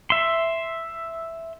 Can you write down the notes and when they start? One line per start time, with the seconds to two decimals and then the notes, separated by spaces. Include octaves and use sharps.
0.10 E5 C6